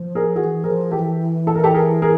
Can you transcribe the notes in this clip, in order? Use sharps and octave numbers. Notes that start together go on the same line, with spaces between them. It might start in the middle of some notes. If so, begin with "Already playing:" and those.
Already playing: F3
G#4 A#4
E3 F#4 G#4
F3 G#4 A#4
E3 G4 A4
A4
A#4
G4 A4
G#4 A#4
G#4 A#4